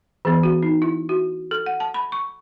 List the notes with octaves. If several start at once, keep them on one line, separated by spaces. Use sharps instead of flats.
E3 B3 G#4
F#4
D#4
E4
F#4
A4
F#5
A5
B5
C#6